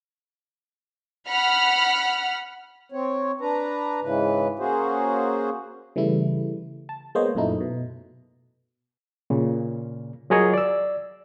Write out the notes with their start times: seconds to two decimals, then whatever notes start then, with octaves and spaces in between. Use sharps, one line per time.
1.28 F#5 B5 F6
2.92 C4 C#5
3.41 D4 B4 A#5
4.02 G#2 C#3 E3 B4
4.59 A#3 C#4 F#4 G#4 C5
5.96 C#3 E3 G3 A3 E4
6.89 A5
7.15 G#3 A#3 B3 C5 C#5 D#5
7.35 F#2 A#2 A3 D#4 E4
7.61 B2
9.30 A#2 C#3
10.30 F#3 F4 G#4 A#4 C#5 D#5
10.54 D5 E6